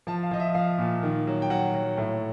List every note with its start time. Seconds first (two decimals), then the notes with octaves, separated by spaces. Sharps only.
0.07 F3 A5
0.23 F5
0.31 F3 D#5
0.40 E5
0.54 F3 F5
0.78 A#2
1.03 D#3
1.27 F#3
1.42 G5
1.50 F#3 F#5
1.74 F#3
1.97 A2